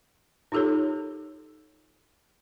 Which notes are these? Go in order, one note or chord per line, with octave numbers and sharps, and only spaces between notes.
D#4 F4 G4 A4 A#4 C#5